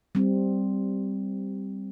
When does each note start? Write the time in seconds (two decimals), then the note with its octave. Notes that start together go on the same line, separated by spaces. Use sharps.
0.15 G3 C4